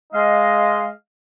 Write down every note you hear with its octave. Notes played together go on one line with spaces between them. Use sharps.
G#3 D#5 F5